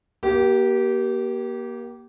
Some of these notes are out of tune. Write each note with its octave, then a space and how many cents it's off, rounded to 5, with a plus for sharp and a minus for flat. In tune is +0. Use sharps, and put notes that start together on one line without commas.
A#3 +25 G4 -20